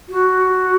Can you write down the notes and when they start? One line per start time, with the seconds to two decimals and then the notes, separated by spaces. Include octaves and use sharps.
0.09 F#4